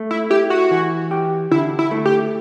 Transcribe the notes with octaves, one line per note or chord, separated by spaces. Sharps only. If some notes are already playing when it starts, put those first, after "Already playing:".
Already playing: A3
E4
E4 G4
F#4
E3
G4
D3 E4
E4
A3
G4